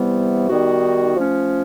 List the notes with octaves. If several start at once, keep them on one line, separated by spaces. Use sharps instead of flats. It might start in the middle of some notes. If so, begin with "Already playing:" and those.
Already playing: C3 E3 G3 B3
D#3 G3 B3 D#4 F#4
F3 A3 C#4